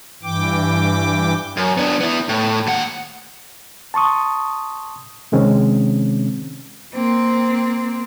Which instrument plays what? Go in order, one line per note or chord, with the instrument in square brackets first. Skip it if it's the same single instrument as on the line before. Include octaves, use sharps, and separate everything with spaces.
[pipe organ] G2 E3 G5 D6
[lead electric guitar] F#2
B3 D4
B3 E4
A2
D#2 F#5
[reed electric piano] A5 C6 C#6 D#6
C3 D#3 G#3 C4 C#4
[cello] A#3 C4